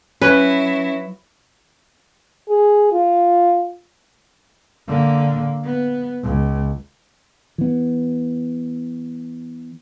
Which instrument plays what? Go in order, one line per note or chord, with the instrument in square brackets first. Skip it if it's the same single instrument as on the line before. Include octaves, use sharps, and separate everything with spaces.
[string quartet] F#3 E4 [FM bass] C#4 [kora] B4
[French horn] G#4
F4
[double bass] D3 A#3
B3
C#2
[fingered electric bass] E3 B3